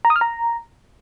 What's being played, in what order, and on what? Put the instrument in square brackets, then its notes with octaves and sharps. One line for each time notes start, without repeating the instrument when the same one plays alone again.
[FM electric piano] A#5
D#6
F6
A#5